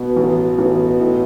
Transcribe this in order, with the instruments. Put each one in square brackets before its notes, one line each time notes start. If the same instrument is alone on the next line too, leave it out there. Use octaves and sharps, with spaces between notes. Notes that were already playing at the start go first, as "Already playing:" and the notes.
Already playing: [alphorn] B2 [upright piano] B3
[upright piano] A1
A1
A2